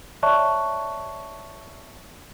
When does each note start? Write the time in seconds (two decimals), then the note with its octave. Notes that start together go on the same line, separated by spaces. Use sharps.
0.23 C#5 D5 E5 A5 C#6 F#6